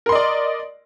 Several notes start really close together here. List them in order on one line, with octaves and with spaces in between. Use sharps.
A#4 C6 D#5 D5